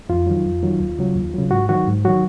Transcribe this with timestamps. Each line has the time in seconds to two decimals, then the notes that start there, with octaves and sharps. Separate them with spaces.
0.09 F2 F4
0.27 D#3 F#3
0.45 F2
0.62 D#3 F#3
0.80 D#2
0.99 C#3 F#3
1.15 D#2
1.34 C#3 F#3
1.51 G#2 F#4
1.69 D#3 F#3 F#4
1.87 G#2
2.05 D#3 F#3 F#4